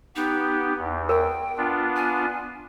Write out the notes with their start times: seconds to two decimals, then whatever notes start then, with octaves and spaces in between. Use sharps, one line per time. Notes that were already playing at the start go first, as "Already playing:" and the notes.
0.16 B3 D#4 G4
0.77 E2
1.09 A#4 G5
1.57 B3 D4 F4
1.96 G#5